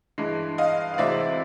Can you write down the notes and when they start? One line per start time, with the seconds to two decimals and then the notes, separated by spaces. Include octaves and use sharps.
0.18 G2 E3 G#3
0.58 D#5 F5
0.94 F5
0.98 D2 C3 E3 G#3 C4 D5 E5